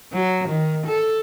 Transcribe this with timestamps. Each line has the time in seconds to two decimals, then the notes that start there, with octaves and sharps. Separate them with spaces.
0.12 F#3
0.48 D#3
0.86 A4